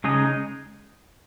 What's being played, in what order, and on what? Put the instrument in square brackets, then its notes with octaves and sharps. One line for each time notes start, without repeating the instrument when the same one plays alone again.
[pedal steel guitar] C#3 G#3 D#4 G#4 D#5